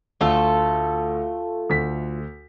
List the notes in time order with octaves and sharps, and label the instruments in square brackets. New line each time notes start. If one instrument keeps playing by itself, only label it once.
[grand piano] D2 [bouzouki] A3 F4 A4
[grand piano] D2 B6